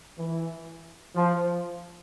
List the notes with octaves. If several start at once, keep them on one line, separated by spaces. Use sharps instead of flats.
E3
F3